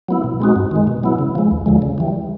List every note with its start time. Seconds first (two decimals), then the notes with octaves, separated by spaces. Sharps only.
0.08 F#3 B3 E4
0.24 B2
0.40 G#3 C4 D#4 F#4
0.56 G2
0.71 D#3 G#3
0.87 B2
1.03 F#3 B3 E4
1.19 C#3
1.35 F3 G#3
1.51 D#2
1.66 D3 F3 G#3
1.82 C#3
1.98 E3 G3